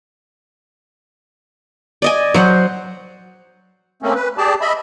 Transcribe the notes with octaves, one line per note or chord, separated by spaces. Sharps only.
D5 D#5 G#5
F#3 C5 F#5
A3 A#3 C4 C#4
B4
G4 G#4 D5 A5
D#5 E5 B5